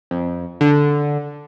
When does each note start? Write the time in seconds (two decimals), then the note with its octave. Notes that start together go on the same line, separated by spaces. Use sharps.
0.11 F2
0.61 D3